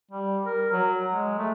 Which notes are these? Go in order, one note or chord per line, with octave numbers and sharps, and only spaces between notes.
G3
A#4
F#3
G#3
A3